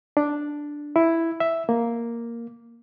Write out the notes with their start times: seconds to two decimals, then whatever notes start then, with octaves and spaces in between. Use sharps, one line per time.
0.17 D4
0.96 E4
1.40 E5
1.69 A#3